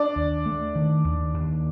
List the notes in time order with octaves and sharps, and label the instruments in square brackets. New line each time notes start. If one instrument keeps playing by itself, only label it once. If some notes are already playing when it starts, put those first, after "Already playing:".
Already playing: [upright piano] D4 D5
[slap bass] D#2
A3
D#3
D#2
D#2